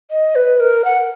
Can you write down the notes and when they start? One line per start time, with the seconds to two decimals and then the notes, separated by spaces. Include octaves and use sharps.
0.11 D#5
0.35 B4
0.59 A#4
0.84 F#5